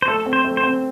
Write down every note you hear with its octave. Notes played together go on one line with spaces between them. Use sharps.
C5
A3 A4
C4
C5
A3
C5
C4